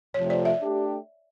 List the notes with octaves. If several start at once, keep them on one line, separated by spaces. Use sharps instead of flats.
F2 C3 F3 A3 C#5
D5
E5
A3 D4 G4